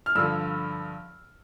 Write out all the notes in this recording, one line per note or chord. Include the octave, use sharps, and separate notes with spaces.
F6
G2 D3 F3 E6